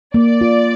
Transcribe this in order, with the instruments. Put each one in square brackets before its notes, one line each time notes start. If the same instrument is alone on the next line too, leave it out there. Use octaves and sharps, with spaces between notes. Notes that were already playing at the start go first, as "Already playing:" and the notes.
[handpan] A#3 [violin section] D5
[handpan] F4